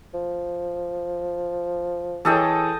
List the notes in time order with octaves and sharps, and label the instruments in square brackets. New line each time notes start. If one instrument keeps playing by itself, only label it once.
[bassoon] F3
[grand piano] E3 G#4 C#5 [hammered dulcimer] A4 D#5 G5